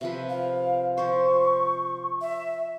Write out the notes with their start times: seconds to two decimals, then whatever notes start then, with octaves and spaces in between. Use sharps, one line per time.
0.01 C3 F3 B4 E5
0.29 F5
0.98 F3 C5 C#6
2.21 E5